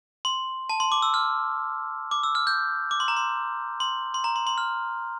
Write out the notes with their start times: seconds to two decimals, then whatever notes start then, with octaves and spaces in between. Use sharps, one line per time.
0.25 C6
0.70 A5
0.80 C6
0.92 D6
1.02 E6
1.14 F6
2.11 D6
2.23 E6
2.35 F6
2.47 G6
2.91 D6
3.00 C6
3.08 A#5
3.17 C6
3.80 C6
4.14 C6
4.24 A#5
4.36 C6
4.47 C6
4.58 F6